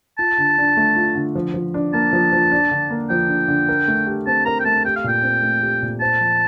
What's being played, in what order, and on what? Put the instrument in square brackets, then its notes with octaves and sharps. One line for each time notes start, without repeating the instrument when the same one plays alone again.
[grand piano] F4 [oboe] A5
[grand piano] D3
D4
A3
F4
D3
F3
F3
D4
[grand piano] A#3 [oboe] A5
[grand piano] F3
F3
D4
D3
A#3
[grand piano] F3 [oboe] G5
[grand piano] D4
D3
A#4
A3
G4
[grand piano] C4 [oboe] A5
[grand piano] A#4 [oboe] A#5
[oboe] G5
[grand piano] A3 [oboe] A5
[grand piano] G4 [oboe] G5
[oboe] F5
[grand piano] A#2 [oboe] G5
[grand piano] C4
A3
G4
A#2
[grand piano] C5 [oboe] A5
[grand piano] F3